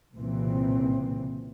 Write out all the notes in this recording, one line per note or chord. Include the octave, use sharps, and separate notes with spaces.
C2 A#2 C#3 E3 C4